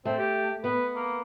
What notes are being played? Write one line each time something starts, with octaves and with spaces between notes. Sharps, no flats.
A3 C4
G4
B3 B4
A#3